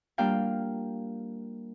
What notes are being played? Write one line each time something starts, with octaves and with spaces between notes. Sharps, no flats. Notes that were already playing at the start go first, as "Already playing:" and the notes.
G3 A#3 D4 F4 F5 G5